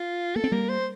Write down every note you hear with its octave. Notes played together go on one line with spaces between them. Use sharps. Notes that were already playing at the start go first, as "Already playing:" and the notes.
Already playing: F4
A#3 A4
C4
G3 A#3 A#4
C5